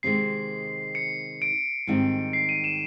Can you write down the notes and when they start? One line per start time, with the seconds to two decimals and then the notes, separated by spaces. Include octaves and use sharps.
0.03 C3 D#3 G#3 C4 C7
0.95 C#7
1.42 D7
1.87 G#2 D#3 G3 C4 D#4
2.33 C7
2.49 D#7
2.64 E7